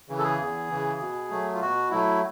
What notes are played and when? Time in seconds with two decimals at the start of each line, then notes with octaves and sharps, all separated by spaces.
0.09 C#3 E3
0.18 A4
0.24 G#4
0.39 E2
0.69 C#3 E3
1.00 B2
1.30 F#3 A3
1.54 F4
1.61 B2 F#4
1.91 F#3 A3 E4